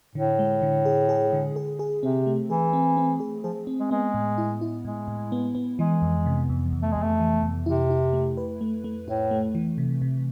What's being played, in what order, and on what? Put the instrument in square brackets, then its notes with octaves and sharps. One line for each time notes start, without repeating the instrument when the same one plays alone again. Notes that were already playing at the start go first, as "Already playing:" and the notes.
[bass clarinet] A2 [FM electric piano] D3
[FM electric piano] G#3
D3
G#4
G#4
D3
G#4
G#4
[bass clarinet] C3 [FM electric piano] C4
[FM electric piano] A3
[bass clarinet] E3 [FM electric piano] G#4
[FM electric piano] C4
C4
G#4
[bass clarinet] F3 [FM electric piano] G#4
[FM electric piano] C4
[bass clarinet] G#3
[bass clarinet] G#3 [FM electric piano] B3
[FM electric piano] A2
E4
E4
[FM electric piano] A2 [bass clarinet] G#3
[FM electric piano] A2
B3
B3
[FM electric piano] E3 [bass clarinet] G#3
[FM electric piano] F2
C3
F2
F2
[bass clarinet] A3
[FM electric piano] F2 [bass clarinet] G#3
[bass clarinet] A3
[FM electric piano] E3
F2
[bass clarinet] C3 [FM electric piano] E4
[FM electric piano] E4
A3
B4
A3
A3
[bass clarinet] A2 [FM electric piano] E4
[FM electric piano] A3
E3
C3
C3